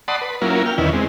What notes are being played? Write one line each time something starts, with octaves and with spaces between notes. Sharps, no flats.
D5 F#5 A5 B5 C6 D#6
B4
F#3 A#3 C#4 E4 F4 A#4
G5 F6
E2 D3 D#3 C#4 E4 B4
G#3 C4